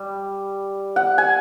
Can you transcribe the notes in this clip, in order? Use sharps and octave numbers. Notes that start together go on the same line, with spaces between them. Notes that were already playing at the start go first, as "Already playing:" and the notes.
Already playing: G3
F#5
G#5